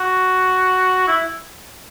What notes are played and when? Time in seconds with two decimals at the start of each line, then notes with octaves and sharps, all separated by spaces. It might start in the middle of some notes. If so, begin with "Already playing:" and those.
Already playing: F#4
1.08 E4